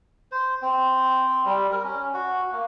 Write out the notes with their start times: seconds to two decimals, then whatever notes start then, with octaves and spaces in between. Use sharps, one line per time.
0.32 C5
0.62 C4
1.45 G3
1.71 A#4
1.84 C#4
2.13 F#4
2.52 A#3